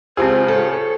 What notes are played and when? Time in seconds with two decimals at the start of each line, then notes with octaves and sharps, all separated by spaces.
0.17 C#2 C4 F4 G4 G#4 C5
0.48 A4 C#5